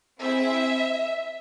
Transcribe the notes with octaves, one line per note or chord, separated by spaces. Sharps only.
C4 E4 G#4 E5